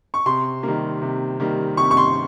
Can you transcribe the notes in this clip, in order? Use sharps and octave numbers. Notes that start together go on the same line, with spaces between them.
C#6
C3 C6
D#3 G3 A#3
C3
D#3 G3 A#3
C3 C#6
C#6
C6